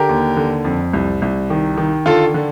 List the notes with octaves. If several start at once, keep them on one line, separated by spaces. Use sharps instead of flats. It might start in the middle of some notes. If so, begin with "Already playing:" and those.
Already playing: D3 G4 A#4
D#2
D3
F2
C2
C2
D#3
D#3
D3 F4 A4
D3